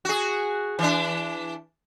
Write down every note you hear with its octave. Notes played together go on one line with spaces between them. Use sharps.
F#4 G#4
E3 D4